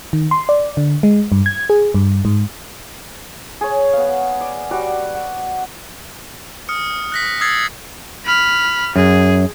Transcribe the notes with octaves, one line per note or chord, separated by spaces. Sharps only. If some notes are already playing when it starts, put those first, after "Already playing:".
D#3
C6
D5
D3
G#3
G2
G#6
G#4
G2
G#2
G#4 C#5
B3 F5
D5
G3 F#4 D6
F#5
D#6 F6 C#7
F#6 A#6 B6
D#6 E6 G#6 A6 C7
B5 F6
F#2 G#4